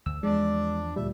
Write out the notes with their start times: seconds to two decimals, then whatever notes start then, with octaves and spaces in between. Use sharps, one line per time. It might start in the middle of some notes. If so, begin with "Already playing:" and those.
0.06 D2 E6
0.23 E2 F3 G#3 D4 D5
0.96 D2 A#2 G3 E5